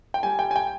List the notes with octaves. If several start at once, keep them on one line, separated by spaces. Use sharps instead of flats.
G5
G3 G#5
G5
G#5
G5